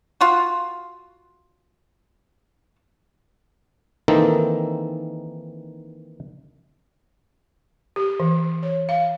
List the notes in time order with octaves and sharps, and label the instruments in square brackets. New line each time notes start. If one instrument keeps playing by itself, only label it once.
[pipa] F4 F#4
[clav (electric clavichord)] D#3 E3 A#3 C4 D#4 A4
[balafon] G4
E3
C#5
F5